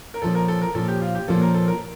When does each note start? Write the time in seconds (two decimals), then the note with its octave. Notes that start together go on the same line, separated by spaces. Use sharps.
0.14 A#4
0.22 A#2 F3 C#4 A4
0.35 A#4
0.48 A4
0.62 A#4
0.75 A#2 F3 C#4 A4
0.88 G4
1.02 F4
1.15 G4
1.28 A#2 F3 A#3 C#4 A4
1.42 A#4
1.54 A4
1.68 A#4